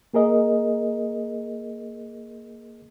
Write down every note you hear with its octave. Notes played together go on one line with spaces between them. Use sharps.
A#3 G#4 A#4 D#5